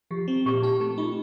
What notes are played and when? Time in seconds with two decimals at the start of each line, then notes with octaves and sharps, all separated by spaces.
0.11 F3 G4
0.28 C4
0.46 A#2 G4
0.62 D#4 G4
0.80 A3 D#4
0.98 D#4 F4